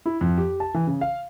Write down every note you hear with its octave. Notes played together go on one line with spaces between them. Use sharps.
E4
F2
G4
A5
E3
C#3
F5